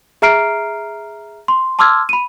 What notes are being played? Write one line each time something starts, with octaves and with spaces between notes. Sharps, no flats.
G#4 E5 A#5 F6 C7 D7
C6
A5 C6 D6 E6 F6 G#6
B5 D#7